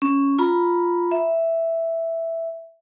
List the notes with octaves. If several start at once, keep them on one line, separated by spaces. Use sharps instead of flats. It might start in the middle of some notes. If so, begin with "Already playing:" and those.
C#4
F4 A#5 B5
E5